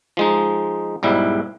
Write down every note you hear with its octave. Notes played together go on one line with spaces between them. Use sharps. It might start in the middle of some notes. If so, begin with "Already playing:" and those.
F3 G#3 D#4
B1 G#2 G3 E4